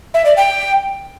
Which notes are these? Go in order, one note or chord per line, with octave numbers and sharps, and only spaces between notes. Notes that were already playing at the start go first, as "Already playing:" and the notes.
E5
D5
G5